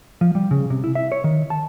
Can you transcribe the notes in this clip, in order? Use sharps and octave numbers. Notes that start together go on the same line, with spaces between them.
F3
G3
C#3
C3
E4
E5
C#5
D#3
A5